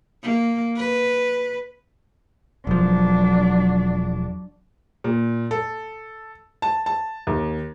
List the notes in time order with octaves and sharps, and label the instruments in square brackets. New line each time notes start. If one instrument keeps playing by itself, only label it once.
[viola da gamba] A#3
B4
[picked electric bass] E1 F3 [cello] F#3 D4
[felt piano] A#2
A4
A5
A5
D#2